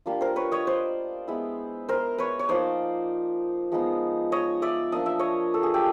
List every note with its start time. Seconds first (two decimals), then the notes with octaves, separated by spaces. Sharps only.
0.06 G3 A#3 D4 F4
0.21 A#4 C5
0.36 B4 C#5
0.52 C#5 D#5
0.67 C5 D5
1.28 G#3 B3 E4
1.89 A#4 C5
2.18 B4 C#5
2.39 C#5
2.49 F3 A#3 D#4 C5 D5
3.72 F3 G#3 B3 D#4
4.32 C#5 D#5
4.62 D5 E5
4.92 F3 A#3 D4 D#5
5.06 E5
5.19 C#5 D#5
5.54 A4
5.63 G#4
5.74 G4 A4